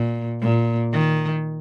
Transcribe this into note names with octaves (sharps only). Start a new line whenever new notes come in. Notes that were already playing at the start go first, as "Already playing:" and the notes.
Already playing: A#2
A#2
D#3